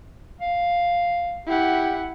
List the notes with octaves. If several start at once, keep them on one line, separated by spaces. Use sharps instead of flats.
F5
E4 G4 F#5